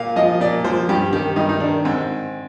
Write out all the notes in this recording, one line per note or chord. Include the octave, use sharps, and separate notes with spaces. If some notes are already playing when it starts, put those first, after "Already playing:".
Already playing: A#2 F5
F3 D#5
A#2 D5
F3 C5
G2 G4
D#3 G4
G2 D#4
D#4
D#3 D4
G#2 C4